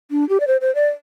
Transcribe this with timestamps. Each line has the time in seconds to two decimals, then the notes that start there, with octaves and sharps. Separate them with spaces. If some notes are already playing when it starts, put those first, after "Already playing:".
0.11 D4
0.29 G4
0.40 D5
0.47 C5
0.61 C5
0.75 D5